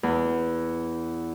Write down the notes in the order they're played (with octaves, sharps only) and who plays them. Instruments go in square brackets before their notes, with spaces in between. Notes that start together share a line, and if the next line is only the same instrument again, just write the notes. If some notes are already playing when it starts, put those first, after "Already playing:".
[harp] E2